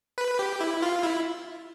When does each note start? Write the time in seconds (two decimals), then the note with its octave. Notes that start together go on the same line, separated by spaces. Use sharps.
0.18 B4
0.39 G4
0.60 E4
0.82 F4
1.03 E4